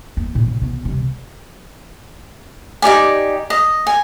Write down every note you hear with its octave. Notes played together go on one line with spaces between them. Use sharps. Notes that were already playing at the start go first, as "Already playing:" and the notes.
A#3
A#2
A#2
B2 B3
C3 G3
D#4 G4 D5 G#5
D#5
G#5